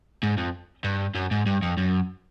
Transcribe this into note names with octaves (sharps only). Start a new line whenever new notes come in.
G#2
F2
G2
F#2
G#2
G2
F2
F#2